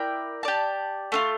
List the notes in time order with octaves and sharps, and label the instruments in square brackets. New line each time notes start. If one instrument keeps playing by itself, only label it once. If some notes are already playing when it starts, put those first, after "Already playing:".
Already playing: [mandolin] E4 A#4 D5 G5
G4 D5 A5
A3 D4 F4